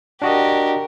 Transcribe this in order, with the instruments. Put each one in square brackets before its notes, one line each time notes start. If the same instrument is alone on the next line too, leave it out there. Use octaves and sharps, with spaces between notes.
[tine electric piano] D4 F#4 D#5 [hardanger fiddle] G4 A#4